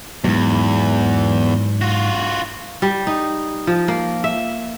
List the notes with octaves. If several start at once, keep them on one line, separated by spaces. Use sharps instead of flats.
E2 G#2 F#3
F4 F#4
G3
D#4
F3
A#3
E5